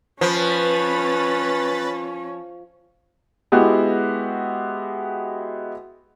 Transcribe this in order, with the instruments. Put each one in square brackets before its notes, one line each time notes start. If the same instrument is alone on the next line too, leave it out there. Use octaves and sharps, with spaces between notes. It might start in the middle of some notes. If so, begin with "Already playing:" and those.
[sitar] F3 [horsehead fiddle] C#4 C#5 [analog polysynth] B4 B5 A6
[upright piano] G#3 B3 E4 F#4 G4